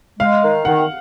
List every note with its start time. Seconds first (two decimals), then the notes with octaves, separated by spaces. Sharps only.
0.20 G#3 F5
0.42 D#3
0.65 D#3 F#5